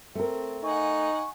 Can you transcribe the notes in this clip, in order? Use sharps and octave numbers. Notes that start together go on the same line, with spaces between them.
A3 C4 A#4
D#4 F#5 G#5 C#6